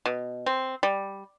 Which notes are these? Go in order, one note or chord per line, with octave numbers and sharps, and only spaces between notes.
B2
C4
G3